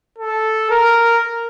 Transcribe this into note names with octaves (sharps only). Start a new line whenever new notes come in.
A4
A#4